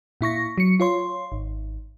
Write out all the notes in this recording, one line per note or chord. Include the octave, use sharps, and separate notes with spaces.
A#2 E4 C#6 A#6
F#3 C#7
F4 C#5 C6
G#1